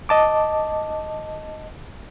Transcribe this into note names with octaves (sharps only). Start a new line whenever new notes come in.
D#5 A5 D6